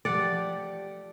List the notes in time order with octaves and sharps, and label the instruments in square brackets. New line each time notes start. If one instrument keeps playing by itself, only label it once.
[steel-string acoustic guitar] F3 A3 G4 [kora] D5 F#5